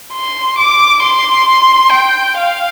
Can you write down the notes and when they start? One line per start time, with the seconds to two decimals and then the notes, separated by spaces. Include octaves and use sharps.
0.13 C6
0.59 D6
1.03 C6
1.93 G5
2.37 F5